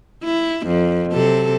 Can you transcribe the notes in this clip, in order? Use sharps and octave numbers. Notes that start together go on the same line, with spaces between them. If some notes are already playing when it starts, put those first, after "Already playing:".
E4
F2
C3 F#3 A4